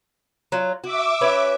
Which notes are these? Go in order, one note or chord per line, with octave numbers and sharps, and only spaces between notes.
F#3 F4
F#4 E5 D6
C#4 F#4 B4